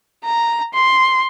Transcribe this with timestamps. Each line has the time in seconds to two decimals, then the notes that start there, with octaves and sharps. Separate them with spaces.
0.25 A#5
0.74 C6